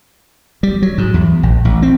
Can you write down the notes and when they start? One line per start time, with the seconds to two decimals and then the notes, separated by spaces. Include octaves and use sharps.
0.63 G3
0.82 F#3
0.98 G#2
1.14 E2
1.43 A#1
1.65 A1
1.82 C4